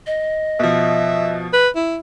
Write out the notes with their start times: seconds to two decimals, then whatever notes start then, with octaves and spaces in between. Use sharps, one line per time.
0.07 D#5
0.59 B2 F3 E5
1.53 B4
1.76 E4